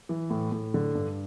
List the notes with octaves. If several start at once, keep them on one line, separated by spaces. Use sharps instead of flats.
E3
A2
A2
D3
G2